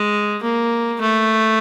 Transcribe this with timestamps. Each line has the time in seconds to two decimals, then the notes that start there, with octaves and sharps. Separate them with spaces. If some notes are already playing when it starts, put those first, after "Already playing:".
Already playing: G#3
0.43 A#3
1.01 A3